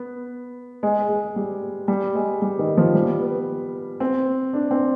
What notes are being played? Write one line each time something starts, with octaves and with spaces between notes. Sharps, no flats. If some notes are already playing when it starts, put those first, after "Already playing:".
Already playing: B3
G#3
G#3
G3
G3
G#3
G3
D#3
F3
G3
B3
C4
D4
C4